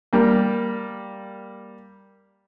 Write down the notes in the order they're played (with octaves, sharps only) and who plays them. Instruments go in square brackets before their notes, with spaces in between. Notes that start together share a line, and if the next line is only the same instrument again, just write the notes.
[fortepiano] G3 A#3